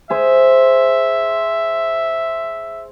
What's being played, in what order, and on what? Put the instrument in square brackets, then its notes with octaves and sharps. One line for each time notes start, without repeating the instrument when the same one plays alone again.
[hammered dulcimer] G#4 C5 [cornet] E5